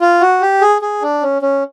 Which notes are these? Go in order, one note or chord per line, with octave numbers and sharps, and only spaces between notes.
F4
F#4
G4
G#4
G#4
D4
C#4
C#4